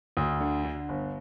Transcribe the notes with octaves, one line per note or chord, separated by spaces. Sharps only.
D2
D3
D3
G1